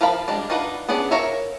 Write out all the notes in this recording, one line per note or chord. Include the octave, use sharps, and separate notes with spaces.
F3 A#4 F5 A5 B5
G3 G#3 D4
D4 D#4 F4 B4 F#5
B3 C#4 D4 G#4
A#4 C#5 E5 F5 G#5